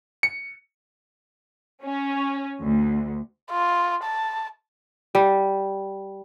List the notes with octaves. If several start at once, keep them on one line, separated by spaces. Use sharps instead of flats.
C#7
C#4
D2
F4
A5
G3